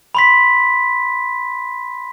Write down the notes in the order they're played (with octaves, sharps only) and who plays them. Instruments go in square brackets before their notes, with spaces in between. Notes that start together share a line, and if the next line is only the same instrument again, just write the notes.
[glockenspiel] B5 C6 B6